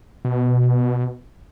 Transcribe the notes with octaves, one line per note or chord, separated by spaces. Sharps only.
B2